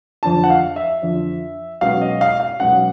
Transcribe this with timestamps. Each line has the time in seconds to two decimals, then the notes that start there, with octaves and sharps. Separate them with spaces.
0.23 F2 D3 F3 A5
0.44 F#5
0.50 F5
0.76 E5
1.02 F2 D3 F3
1.81 B1 B2 G#3 C#4 F5
2.01 D#5
2.21 F5
2.40 F5
2.60 B1 B2 G#3 C#4 F#5